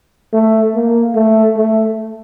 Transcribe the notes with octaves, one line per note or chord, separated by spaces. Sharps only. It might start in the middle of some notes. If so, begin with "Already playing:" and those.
A3
A#3
A3
A3